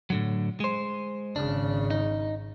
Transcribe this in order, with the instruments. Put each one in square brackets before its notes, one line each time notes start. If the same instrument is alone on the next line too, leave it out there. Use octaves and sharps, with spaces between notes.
[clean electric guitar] A2 D3 F#3
G#3 C5
[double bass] G#1 C#3 [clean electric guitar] D4
[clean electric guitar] D#4